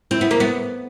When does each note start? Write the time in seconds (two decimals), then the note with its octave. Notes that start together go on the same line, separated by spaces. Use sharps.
0.11 C4 E4
0.21 B3
0.31 A#3
0.40 B3